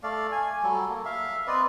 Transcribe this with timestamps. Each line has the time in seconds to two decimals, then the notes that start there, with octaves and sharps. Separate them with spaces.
0.03 A3 D5 F5
0.32 G#5
0.63 F#3 G3 A4
0.89 A#3
1.05 E5 F5
1.47 C4 B4 D5 D#5